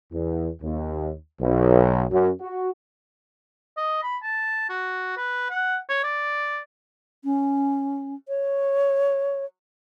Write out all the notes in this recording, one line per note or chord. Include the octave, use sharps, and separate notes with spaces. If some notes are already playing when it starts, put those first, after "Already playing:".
E2
D#2
B1
F#2
F#4
D#5
B5
A5
F#4
B4
F#5
C#5
D5
C#4
C#5